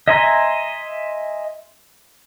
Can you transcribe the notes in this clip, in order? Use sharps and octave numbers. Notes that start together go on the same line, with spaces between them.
D#5 E5 G#5 A#5 C6